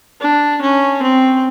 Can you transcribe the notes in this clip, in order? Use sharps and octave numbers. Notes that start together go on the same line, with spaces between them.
D4
C#4
C4